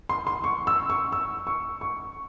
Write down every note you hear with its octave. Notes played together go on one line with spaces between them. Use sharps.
C6
C6
C#6
E6
C#6
E6
C#6
C#6